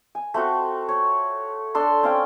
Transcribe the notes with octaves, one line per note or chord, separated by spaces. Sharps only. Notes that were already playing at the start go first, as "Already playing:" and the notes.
G#5
A3 C4 F#4
C#5
D4 A4 C6
C4 C#4 F5 G5